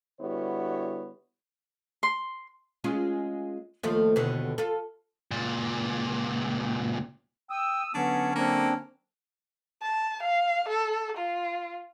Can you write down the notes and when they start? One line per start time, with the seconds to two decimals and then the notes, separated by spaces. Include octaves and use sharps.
0.21 D3 G3 B3 E4 F#4 C#5
2.03 C6
2.84 G#3 C#4 F4
3.83 D#2 F3 A3
4.16 D#2 B2 D3
4.58 F4 A4
5.31 C#2 A#2
7.50 G5 D#6 E6
7.95 D3 F#3 B3 C#4 D4
8.35 A#3 C4 D4
9.82 A5
10.23 F5
10.69 A4
11.17 F4